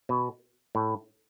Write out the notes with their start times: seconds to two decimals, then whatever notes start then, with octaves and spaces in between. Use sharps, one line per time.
0.09 B2
0.75 A2